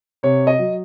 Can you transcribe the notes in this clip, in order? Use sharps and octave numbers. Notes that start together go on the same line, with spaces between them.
C3 C#5
D#5
F#3